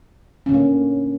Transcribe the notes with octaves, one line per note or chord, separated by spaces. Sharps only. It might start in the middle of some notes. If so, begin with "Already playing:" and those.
A#2 D3 A#3 C#4